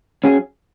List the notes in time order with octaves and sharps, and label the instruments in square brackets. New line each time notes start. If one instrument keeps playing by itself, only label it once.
[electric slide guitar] F#3 C#4 G#4